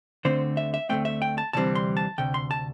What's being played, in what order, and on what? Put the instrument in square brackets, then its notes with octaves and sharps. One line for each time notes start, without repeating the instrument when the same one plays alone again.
[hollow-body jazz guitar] D2 D3 A3 C4 C5
E5
E5
D2 D3 A3 C4 G5
E5
G5
A5
D2 C3 E3 G3 C4 A5
C6
A5
D2 C3 G5
C6
A5